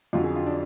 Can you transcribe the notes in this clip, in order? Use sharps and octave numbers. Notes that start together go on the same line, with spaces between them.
F2 D3 F#3 F4
G#4
F4
D4